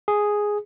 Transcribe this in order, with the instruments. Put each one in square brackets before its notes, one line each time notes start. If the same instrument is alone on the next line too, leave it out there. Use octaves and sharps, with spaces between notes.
[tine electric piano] G#4